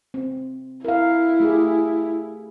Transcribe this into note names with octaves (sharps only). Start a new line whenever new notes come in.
C4
E4 A#4 F5
A3 G4 G#4